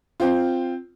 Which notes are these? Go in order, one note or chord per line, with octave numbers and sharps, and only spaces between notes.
C4 F4